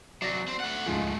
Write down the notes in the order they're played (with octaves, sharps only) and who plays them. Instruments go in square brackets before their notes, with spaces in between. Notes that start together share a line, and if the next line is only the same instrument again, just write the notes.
[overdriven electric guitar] C3 F#3 [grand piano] D5 A#6
[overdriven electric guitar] C4
A3 F#5
[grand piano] C#2 G#2 F3 [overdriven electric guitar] G#3 A3